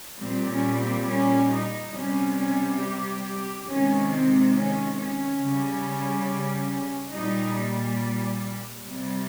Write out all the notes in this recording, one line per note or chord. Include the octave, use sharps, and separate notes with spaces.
A#2 G3 C4
C#4
C4
C#4
D#4
C3 G3 C#4
C#4
G4
C3 D#3 G#3 C#4
C4
C#4
C#4
C#3 G3
A#2 G3 D#4
C3 G3